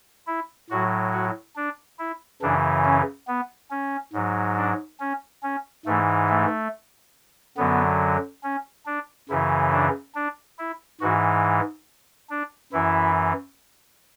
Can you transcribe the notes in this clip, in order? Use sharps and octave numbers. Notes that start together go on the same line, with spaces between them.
E4
A2 F#3 F#4
F#4
D4
E4
F#2 C#3 E3 D4
C#4
B3
C#4
G#2 F#3
D4
C#4
C#4
G#2 E3 A3
A3
F#2 D3 F#3 B3
C#4
D4
F#2 C#3 E3 E4
D4
D4
E4
G#2 E3 F#4
D4
F#2 E3 E4